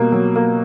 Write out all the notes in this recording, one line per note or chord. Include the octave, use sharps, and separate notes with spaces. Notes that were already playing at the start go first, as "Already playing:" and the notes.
Already playing: B2 G3 A#3
F#3
A#3